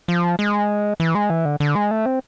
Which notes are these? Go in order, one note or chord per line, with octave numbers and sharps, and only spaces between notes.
F3
G#3
E3
G#3
E3
D3
D3
G#3
A3
C4